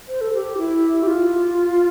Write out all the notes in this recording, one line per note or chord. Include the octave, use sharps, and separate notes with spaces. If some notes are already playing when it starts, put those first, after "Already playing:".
C5
A4
G4
E4
G4
F4